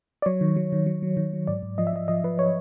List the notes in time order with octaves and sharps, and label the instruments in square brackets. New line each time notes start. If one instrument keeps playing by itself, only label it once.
[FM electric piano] D5
F#3 C#5
D#3
F#3
D#3
F#3
F#3
D#3
F#3
G#2 D5
G#2
F3 D#5
E5
F3 D#5
F3 D#5
F3 B4
C#5